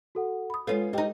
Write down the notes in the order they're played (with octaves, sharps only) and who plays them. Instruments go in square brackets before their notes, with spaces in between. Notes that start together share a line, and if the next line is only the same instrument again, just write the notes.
[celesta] F#4 A4 F#5
[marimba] B5 D#6
[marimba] G#3 A4 [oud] C#4 F4 [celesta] B4
[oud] G3 D#4 [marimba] D#5 G5